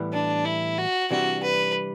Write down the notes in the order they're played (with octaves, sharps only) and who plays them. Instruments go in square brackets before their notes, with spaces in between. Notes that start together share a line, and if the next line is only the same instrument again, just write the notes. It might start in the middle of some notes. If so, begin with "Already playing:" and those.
Already playing: [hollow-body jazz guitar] A2 E3 G3 B3
[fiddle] D4
E4
F#4
[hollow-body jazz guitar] C3 E3 G3 D4 G4 [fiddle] F#4
[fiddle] B4